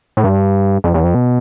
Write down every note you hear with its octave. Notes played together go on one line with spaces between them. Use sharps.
A2
G2
F2
E2
F2
B2